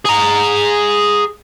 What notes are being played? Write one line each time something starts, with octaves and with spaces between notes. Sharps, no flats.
G#4 A#5